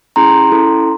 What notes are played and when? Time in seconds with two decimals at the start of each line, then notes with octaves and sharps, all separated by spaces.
0.16 C#4 E4 G#4 A#5 C6
0.52 C#4 E4 A4